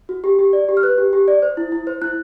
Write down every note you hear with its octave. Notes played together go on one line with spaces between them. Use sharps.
F#4
G4
G4
D5
G4
F6
B4 F#6
G4
G4
D5
C5
E4
E4
C5
E4 F#6